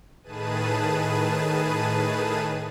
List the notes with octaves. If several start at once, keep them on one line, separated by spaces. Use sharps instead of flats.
A2 D#3 G#4 B4 A5 D#7